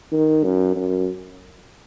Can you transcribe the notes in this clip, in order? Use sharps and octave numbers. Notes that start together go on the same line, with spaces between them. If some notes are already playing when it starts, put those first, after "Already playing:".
D#3
F#2
F#2